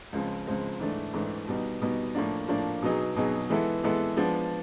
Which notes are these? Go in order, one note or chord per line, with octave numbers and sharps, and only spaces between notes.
C#2 C#3 F3 G#3 C4
C#2 C#3 F3 G#3 C4
G#2 E3 A3 D4
G#2 E3 A3 D4
B2 G3 B3 D#4
B2 G3 B3 D#4
A2 F3 A#3 D4
A2 F3 A#3 D4
B2 F#3 B3 D#4 G#4
B2 F#3 B3 D#4 G#4
E3 G#3 B3 E4 A4
E3 G#3 B3 E4 A4
F3 G#3 B3 D4